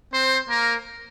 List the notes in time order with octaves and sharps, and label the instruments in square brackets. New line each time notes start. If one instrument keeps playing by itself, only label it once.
[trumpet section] C4 C5
A#3 A#4